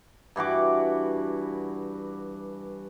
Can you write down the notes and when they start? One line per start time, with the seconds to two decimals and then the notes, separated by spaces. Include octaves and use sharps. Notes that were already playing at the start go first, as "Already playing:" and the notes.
0.36 G2 E3 F#4 D6